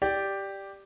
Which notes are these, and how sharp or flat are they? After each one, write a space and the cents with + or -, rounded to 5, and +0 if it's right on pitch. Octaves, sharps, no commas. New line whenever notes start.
G4 +0 D5 +0